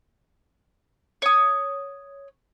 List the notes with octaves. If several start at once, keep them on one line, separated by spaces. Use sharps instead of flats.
C#5 D#6